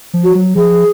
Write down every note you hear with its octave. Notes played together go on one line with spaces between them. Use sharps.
F3
F#4
F#3
F3 G#4